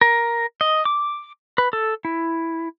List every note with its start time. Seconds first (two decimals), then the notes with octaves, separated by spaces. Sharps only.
0.01 A#4
0.61 D#5
0.85 D6
1.58 B4
1.73 A4
2.05 E4